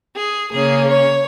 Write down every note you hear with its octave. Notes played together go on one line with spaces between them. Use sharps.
G#4
C#3 A#3 C#4 G#4
C#5